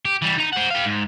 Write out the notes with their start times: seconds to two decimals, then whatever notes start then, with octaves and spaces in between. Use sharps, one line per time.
0.05 G4
0.22 E3 G3
0.38 D#4 A#5
0.53 C5 F#5
0.71 G4 F5
0.85 G#2